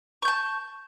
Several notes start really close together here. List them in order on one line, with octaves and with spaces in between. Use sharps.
C#6 G6 A5